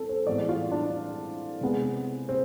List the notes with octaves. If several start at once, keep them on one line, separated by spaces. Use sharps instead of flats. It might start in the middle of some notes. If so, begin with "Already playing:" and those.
Already playing: C4 E4 A4
C5
A2 E3 G#3 B3 D5
F4
D4
C3 G#3 B3
C4